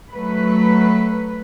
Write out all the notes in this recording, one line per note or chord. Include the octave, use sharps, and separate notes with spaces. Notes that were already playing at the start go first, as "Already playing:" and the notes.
F#3 A3 B4